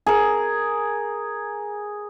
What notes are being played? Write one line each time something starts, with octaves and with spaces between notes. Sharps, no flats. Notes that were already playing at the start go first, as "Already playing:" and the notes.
G#4 A#4